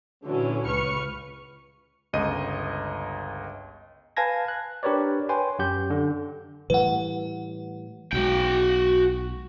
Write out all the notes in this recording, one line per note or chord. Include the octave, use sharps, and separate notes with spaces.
A#2 D3 E3 F#3 C#4
C#2 B4 C#6 F6 C#7
G1 C#2 D#5 D#7
B4 F5 G#5 A5 G#6 A#6
F#6
D4 G4 A#4 B4 C#5 D5
B4 C#5 G5 G#5 C6
F#2 G4 G6
D3
A2 E3 G3 B4 F#5
B1 F#3 G#3 F#4 G5